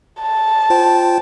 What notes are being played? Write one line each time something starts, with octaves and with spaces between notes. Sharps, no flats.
A5
F4 C5 G5